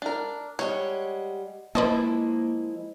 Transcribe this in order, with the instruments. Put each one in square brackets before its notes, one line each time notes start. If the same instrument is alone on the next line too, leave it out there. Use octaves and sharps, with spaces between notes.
[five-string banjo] D4 A#4
[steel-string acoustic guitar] G3 G#3 F#5 [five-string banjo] C#5
[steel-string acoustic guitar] F3 G#3 E4 [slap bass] A#3 [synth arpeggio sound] B4 C5 D#5 [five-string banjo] A5